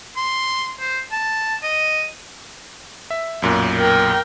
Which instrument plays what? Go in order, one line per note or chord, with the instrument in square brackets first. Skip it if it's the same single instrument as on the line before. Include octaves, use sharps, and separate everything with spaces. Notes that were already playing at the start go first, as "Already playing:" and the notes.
[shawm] C6
C5
A5
D#5
[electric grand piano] E5
B1 F#2 A#2
[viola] A#4 G5